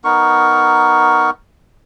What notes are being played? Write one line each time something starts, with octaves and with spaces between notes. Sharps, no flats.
B3 D#4 A#4 C#6